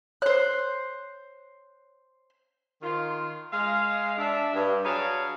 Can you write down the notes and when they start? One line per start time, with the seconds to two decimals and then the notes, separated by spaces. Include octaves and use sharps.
0.22 C5 C#5 F#6
2.82 D#3 F4
3.52 G#3 F5
4.18 D4 E5
4.54 G2
4.84 F#3 D4 G#4 B4 C#5 F5